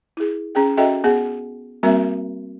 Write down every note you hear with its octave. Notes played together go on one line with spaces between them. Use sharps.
E4 G#4
C#4 G#4 G5
C#4 F#4 A4 D#5 E5 G5
B3 G#4 F#5
G3 A#3 C4 F#4 A#4 E5